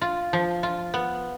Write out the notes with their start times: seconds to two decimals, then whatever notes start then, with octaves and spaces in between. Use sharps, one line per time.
0.01 F4
0.33 F3
0.63 F4
0.94 B3